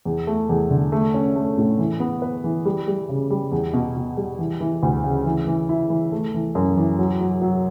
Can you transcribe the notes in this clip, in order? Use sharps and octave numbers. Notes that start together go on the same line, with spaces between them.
E2
A3
E2
D3
A3
C#4
A3
A2
E3
B3
B4
E3
G3
G3
C#3
G3
E2
B2
B2
G3
E3
E3
D2
C#3
E3
E3
E4
E3
A3
E3
F#2
E3
F#3
F#3
F#3